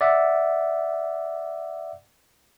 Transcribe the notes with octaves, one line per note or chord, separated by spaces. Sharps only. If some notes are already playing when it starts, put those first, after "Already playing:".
D5 E5 F#5